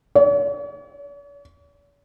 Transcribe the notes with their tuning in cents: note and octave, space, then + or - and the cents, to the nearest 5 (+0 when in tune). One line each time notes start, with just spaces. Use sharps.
C#5 +45